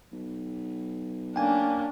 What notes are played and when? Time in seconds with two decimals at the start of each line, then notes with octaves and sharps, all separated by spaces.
0.12 B1
1.36 A#3 C#4 D4 G5 G#5